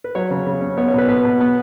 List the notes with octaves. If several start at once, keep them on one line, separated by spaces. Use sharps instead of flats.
B4
F#3 C#5
C#3
C#3
C#4
B3 C#5
C#5
B2 B4
B2 B4
B2
B3